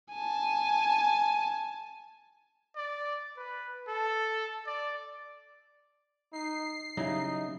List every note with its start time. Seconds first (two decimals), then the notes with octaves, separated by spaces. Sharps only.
0.13 G#5 A5
2.76 D5
3.37 B4
3.88 A4
4.67 D5
6.33 D#4 C7
6.97 C#3 F#3 G3 D#4 E4 D#5 E5